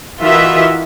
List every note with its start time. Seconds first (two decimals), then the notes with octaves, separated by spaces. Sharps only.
0.21 E3 F4 F#4 A#4 D#5 E5